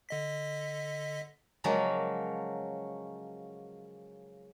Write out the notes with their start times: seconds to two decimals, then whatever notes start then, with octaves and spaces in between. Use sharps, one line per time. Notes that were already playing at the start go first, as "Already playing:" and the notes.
0.09 D3 D#5 B6
1.64 C#3 F3 F#3 G#3 A#3 C#4